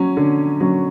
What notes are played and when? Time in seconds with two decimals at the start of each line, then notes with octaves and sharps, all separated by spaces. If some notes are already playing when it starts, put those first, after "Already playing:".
Already playing: F#3 C#4
0.17 D3
0.60 F#3 C#4